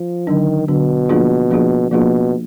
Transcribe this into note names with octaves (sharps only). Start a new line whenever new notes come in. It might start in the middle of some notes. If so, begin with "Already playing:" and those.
Already playing: F3
D3 D#3 F#3 D4
B2 D3 F#3 D4
F3 A#3 D4 F4 G#4
F3 A#3 D4 F4 G#4
B2 F3 A#3 D4 F4 G#4